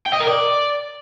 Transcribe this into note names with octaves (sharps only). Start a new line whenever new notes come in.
G5
D#5
A#4
D5